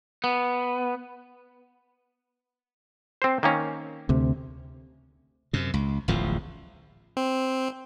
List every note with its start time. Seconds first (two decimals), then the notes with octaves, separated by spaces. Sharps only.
0.24 B3
3.22 C4 C5
3.43 D#3 A#3 C#4
4.09 D2 C3
5.53 F#2 C3
5.74 C#2
6.08 D1 A1 E2 F3
7.17 C4